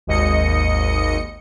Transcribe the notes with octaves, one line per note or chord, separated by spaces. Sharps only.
G#1 D#2 D#5 C#7